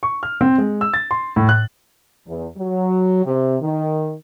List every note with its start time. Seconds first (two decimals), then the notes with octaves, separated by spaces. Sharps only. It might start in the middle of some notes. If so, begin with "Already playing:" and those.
0.03 C#6
0.23 F6
0.41 C4
0.58 G#3
0.81 E6
0.94 A6
1.11 C6
1.36 A2
1.49 F#6
2.27 E2
2.57 F#3
3.25 C3
3.62 D#3